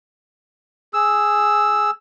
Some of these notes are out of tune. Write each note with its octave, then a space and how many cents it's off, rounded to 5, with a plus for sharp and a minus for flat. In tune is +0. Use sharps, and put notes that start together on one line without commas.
G#4 +0 E6 +0